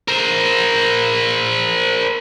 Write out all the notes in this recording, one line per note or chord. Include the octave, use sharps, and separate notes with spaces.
A#4 C5